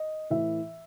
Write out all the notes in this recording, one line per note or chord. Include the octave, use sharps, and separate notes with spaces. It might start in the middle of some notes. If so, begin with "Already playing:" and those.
Already playing: D#5
A2 E3 E5